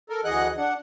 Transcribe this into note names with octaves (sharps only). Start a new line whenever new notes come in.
A4 A#4
D2 E3 G#4 D#5 F#5 F#6
D4 F#5